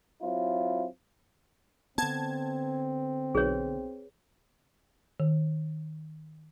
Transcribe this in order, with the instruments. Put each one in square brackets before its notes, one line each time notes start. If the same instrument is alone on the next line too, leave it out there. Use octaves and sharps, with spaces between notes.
[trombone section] F#3 C4 E4 F4
[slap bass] D3 B3 [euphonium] C4 [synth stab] A5 G#6
[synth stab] B1 [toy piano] G#4 B4 C#5
[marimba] D#3